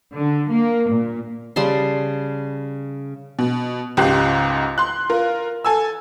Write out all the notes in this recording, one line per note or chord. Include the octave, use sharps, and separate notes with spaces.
D3
A#3
A#2
C#3 G3 A5 C6
B2
C#2 G#2 G4 F#6 C7
C6 F#6
F4 A#4
A4 G#5 E6